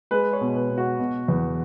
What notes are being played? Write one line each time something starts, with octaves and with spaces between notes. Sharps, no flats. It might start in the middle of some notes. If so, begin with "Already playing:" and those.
G#3 B4
C#5
B2
B4
B2
F#4
B2
E2